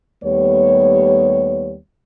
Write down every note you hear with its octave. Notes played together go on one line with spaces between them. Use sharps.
D#2 G3 A3 B3 C#5